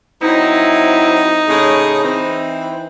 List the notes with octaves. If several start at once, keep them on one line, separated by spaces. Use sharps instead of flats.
F#3 C4 D#4 E4
A2 C#3 G#4
E3 C4